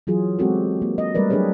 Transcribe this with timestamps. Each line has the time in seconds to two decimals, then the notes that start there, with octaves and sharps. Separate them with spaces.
0.07 E3 F#3 F4 G#4
0.39 G#3 B3 C4 F#4 G4 A4
0.82 A#3
0.98 D#5
1.15 G3 A3 A#4 B4 D5
1.30 F#3 D4 G4 G#4 B4 C#5